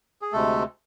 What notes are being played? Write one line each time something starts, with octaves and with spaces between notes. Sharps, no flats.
G#4
D2 C3 G#3 A3 A4